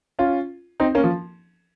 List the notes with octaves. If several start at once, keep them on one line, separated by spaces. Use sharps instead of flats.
C#4 F4
C4 D#4
A#3 C#4
F3